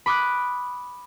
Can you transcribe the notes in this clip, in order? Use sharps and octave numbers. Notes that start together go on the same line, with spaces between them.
B5 D6 D#6 F#6 D7